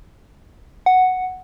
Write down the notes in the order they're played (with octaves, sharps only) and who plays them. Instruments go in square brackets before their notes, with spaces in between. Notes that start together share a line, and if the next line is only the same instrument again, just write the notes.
[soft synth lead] F#5